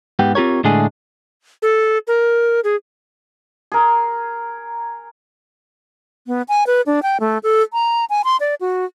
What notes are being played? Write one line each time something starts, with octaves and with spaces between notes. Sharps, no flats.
G#2 B3 G4
C4 F4 G4 A#4 C#5
A2 D3 G#3 A3 D4 G#4
A4
A#4
G#4
G#4 A#4
B3
G#5
B4
D4
G5
A3
A4
A#5
G#5
C6
D5
F#4